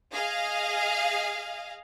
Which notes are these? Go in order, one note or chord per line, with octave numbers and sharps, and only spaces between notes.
G#4 D#5 F5